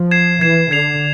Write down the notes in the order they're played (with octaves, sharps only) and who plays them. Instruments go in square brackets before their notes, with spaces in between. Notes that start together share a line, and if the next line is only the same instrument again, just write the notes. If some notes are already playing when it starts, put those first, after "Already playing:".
Already playing: [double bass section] F3
[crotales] G#6 C7 E7
[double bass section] E3 [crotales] G#6 C7 E7
[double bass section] D3 [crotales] G#6 C7 F7